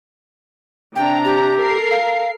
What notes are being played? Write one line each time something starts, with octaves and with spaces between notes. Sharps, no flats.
C3 D4 G5 A#5
G4
A4 A#4 C7
F5